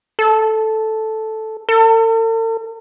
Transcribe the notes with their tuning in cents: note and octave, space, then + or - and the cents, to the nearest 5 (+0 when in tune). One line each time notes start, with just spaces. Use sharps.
A4 -5
A4 +45